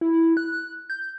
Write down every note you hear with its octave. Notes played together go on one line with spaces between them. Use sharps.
E4
F#6
G6